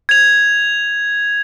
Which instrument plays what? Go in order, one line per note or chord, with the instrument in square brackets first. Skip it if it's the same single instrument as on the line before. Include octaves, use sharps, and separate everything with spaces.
[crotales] G#6 F7